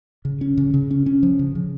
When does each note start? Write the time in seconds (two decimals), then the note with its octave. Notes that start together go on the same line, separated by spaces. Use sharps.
0.25 C#3
0.41 C#4
0.57 C#3
0.74 C#3
0.91 C#4
1.06 C#4
1.23 F3
1.39 C#3
1.55 C#3